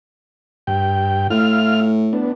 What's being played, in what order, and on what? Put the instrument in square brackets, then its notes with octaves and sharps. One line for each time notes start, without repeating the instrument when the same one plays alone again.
[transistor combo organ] G2 G5
[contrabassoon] A2 [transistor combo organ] E4 F5 F6
[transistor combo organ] B3 D4